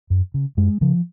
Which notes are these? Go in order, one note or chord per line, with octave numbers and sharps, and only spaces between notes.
F#2
C#3
F#2 G#3
C#3 F3